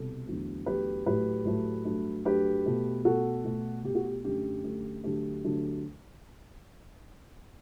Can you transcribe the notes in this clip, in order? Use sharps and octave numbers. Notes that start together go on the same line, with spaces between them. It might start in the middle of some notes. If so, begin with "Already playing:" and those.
Already playing: C2 B2 A4
E2 D3 F#3 A3
E2 D3 F#3 A3 G4 B4
A2 F#3 A3 G4 B4
A2 F#3 A3
G2 F#3 A3
G2 F#3 A3 G4 B4
B2 A3
B2 A3 F#4 A4
B2 A3
B2 A3 G4
F#4
G4
F#2 D3 A3 G4
F#2 D3 A3
D2 D3 F#3 A3 G4
D2 D3 F#3 A3